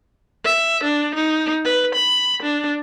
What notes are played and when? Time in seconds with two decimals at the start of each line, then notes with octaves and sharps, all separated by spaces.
0.45 E5
0.84 D4
1.15 D#4
1.65 B4
1.95 B5
2.43 D4